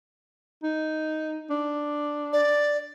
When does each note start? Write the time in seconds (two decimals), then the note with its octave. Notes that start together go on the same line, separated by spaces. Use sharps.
0.63 D#4
1.50 D4
2.33 D5